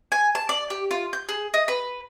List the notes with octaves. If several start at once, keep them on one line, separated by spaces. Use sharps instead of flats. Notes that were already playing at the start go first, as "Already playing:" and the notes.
G#5
A5
D5
G4
F4
G6
G#4
D#5
B4